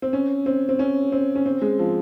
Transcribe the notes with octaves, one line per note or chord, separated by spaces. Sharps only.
C4
C#4
C4
C4
C#4
C4
C#4
C4
G#3
F3